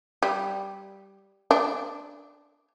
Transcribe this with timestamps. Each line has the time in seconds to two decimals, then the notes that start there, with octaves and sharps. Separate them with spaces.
0.23 G3
1.51 D4